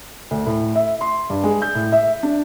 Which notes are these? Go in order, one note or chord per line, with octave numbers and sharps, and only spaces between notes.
D2
A2
E5
C6
G2
G#3
G6
A2
E5
D4